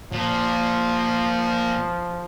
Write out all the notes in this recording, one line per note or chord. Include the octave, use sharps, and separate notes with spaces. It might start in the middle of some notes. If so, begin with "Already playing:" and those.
A#2 F3